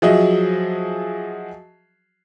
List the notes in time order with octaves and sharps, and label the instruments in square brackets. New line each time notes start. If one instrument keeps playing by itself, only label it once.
[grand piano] F3 F#3 F#4 G#4 D#5 E5